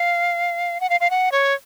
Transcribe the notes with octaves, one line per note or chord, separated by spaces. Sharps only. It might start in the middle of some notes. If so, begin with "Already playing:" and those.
Already playing: F5
F#5
F5
F5
F#5
C#5